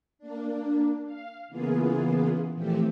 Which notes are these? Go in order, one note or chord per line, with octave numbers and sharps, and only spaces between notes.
A#3 D4
F5
C#3 E3 A#3 B3 F4 G#4
A#2 E3 F3 A3 C4 G4